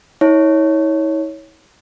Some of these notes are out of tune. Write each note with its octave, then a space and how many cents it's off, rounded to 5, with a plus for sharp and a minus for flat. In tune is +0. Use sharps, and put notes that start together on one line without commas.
E4 -45 C#5 +0